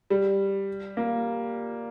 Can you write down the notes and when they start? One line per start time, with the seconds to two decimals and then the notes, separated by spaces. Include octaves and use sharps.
0.10 G3
0.97 A#3